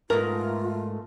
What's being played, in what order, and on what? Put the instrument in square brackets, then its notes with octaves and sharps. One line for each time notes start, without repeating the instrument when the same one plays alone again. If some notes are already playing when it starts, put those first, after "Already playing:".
[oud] G#2 B3 [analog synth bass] A3 [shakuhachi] F4 [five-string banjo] A#4